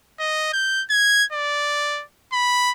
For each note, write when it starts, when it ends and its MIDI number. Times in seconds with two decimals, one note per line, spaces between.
0.19 0.49 75
0.53 0.84 91
0.90 1.24 92
1.32 2.03 74
2.33 2.71 83